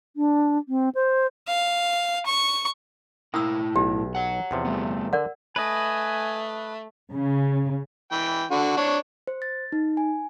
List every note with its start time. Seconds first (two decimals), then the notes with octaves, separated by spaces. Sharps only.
0.16 D4
0.69 C4
0.95 C5
1.47 F5
2.26 C#6
3.34 A2 A#3 E4 G5 D#6 E6
3.76 B1 G4
4.15 C#5 F#5
4.51 E2 C3 F3
4.65 G3 A3 B3
5.13 D3 A#4 D5 F#5
5.56 A3 B4 D#5 G#5
7.13 C#3
8.12 E3 G5
8.51 D3 F#4
8.77 D4 C#5
9.27 C5
9.42 A6
9.72 D#4
9.97 G#5